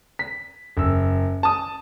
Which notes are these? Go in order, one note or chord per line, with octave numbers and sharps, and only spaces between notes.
B6
F#1 E6
A5 D#6